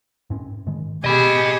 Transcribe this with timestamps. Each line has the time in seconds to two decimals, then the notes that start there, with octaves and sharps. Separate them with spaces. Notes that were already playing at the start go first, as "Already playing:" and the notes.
0.30 G#2 C4 C#4
0.67 G#2 D#3 G#3
1.04 B2 G4 G#4 D#5 B5